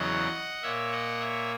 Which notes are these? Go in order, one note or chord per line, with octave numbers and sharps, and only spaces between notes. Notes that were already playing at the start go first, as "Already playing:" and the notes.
Already playing: E2 C#3 F#3 D#5 F#5
A#2 A#3 C#5 E5
D#5 F#5
C#5 E5